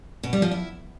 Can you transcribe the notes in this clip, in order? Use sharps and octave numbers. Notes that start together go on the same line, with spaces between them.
B2
G3
F3
E4